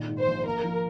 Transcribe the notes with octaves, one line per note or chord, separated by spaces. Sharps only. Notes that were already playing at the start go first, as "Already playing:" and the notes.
Already playing: A#2 D#3
G#2
C5
A#1
A#3 A#4
F3